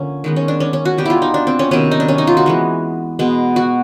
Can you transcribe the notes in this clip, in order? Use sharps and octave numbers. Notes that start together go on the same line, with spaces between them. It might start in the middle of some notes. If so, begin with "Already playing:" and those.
Already playing: D3 F3 A#3 C#4
D#3 G#3 B3
C#4
D4
C#4
C#4
F#4
B2 G3 B3 G4
E4 F4
D#4
D4
C4
C#4
C3 D#3 F#3 B3 C#4
D#4
D4
C#4
D#4
F4
F#4
E3 G#3 B3
B2 G#3 B3
F#4